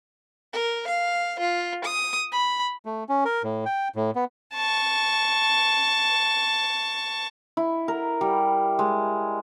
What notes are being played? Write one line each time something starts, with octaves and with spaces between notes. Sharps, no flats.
A#4
F5
F4
D#6
B5
A3
C#4
A#4
A2
G5
A2
B3
A5 C#6
E4
A#4
G3
G#3